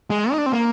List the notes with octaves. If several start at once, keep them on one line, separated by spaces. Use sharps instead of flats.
G#3
D#4
D4
C4
A#3